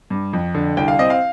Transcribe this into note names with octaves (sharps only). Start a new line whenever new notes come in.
G2
F2
D3
C2 G5
F5
C4 D#5
F5